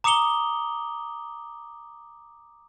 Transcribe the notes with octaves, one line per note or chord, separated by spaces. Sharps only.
A#5 D6 D#6 C#7 F7 G7